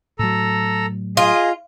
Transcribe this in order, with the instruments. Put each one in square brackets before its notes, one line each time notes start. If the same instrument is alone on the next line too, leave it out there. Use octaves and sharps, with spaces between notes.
[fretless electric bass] A2 F#3 [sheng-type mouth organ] A4 A#5 E6
[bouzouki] F4 [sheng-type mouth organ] G#4 D#5